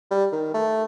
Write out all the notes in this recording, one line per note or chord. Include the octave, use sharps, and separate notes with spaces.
G3
D#3
A3